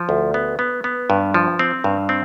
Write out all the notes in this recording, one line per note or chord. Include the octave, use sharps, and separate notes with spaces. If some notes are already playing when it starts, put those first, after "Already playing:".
Already playing: F3
D2
B3
B3
B3
G2
F3
C4
G2
C4